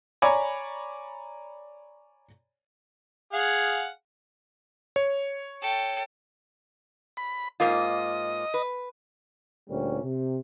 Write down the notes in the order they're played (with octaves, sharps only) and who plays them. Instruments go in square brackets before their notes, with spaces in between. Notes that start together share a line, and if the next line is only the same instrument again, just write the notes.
[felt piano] C#5 D5 G#5 A#5 B5
[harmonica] G#4 F5 F#5
[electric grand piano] C#5
[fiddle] A4 G5
[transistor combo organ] B5
[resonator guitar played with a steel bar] G#2 A#3 F4 [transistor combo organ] D#5
[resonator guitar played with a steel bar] B4
[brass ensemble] D2 A#2 G3 C#4
C3